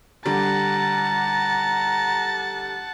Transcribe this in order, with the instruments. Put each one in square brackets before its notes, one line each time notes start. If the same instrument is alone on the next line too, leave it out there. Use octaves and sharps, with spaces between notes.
[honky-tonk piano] D3 G3 [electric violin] F#5 A5 [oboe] A#5